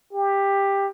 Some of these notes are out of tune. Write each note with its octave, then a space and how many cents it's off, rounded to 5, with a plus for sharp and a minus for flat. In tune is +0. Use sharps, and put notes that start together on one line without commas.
G4 +10